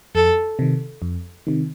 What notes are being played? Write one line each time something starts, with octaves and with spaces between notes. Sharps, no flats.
F2 A4
C3 D#3
F2
C3 D#3